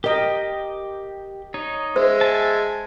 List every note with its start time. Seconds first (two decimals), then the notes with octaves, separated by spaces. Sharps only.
0.04 G4 A#4 D#5 G5
1.54 D#4 C#5
1.96 G#3 C5 E5
2.21 G#5 A5